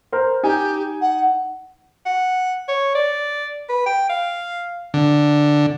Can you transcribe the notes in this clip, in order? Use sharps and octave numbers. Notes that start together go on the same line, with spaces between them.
A#4 C5
D#4 G4 G#5
F#5
F#5
C#5
D5
B4
G5
F5
D3